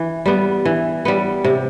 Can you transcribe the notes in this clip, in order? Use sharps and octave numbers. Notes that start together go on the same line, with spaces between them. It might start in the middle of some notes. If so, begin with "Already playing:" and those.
Already playing: E3
G3 B3
E3
G3 B3
C3